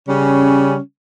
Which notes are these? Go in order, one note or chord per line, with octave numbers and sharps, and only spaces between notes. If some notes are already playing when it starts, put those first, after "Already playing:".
C#3 G3 C#4